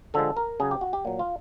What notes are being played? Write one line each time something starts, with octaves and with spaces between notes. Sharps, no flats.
D3 F3 G#3 A4
A#4
C#3 F#3 G#4
G4
F#4
G4
A#2 F#3
F4